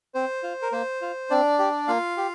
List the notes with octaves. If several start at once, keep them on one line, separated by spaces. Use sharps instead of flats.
C4 C5
F4
A#4
A#3 C5
F4
C4 D4 D5
G4
A#3 F4 F5
G4